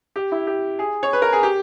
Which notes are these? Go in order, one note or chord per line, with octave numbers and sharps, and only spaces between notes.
G4
E4
G4
G#4
C#5
B4
A#4
G#4
G4